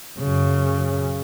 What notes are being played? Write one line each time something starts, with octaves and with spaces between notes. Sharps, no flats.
F#2 C#3